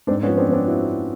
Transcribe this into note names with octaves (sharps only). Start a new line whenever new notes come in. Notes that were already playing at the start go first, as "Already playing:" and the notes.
G#2 C4 D4
B3 C#4
F3
C4 D4
F3
C4 D4
E4 F#4